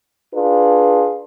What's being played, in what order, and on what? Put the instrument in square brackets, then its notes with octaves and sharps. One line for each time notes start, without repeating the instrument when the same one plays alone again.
[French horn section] D4 F4 G#4 B4